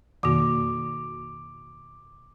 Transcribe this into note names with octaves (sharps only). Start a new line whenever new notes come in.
F2 B2 D#3 A#3 F#4 D6